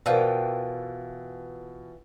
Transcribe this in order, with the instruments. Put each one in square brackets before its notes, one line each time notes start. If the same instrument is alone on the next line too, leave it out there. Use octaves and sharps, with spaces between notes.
[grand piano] B2 [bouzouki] E3 F4 G5 [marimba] A#4 C5 D5